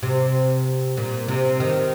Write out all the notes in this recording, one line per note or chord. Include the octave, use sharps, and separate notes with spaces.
C3
A#2
C3
D#3